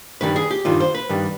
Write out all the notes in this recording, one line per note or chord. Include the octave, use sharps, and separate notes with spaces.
G2 D#3 G3 B4
G#4
G4
G2 D#3 G3 F4
C5
B4
G2 D#3 G3